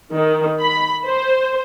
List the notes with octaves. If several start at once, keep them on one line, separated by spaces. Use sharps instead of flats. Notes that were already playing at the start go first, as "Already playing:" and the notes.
D#3
B5
C5